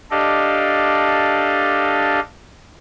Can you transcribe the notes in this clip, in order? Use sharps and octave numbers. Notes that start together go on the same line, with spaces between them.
D4 G4 A4 D5 D#5 F5